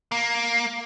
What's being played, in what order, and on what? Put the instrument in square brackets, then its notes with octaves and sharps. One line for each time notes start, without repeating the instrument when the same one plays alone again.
[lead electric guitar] A#3